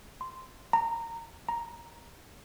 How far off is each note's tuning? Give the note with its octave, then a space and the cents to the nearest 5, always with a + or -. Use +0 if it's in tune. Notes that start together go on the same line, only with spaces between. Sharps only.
C6 -10
A#5 -15
A#5 +5